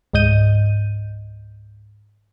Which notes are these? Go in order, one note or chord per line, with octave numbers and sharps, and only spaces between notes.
C#2 G#2 D#5 G6 D#7